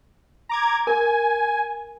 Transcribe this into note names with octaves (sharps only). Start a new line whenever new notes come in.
A#5 D6 G#6
A#4 G#5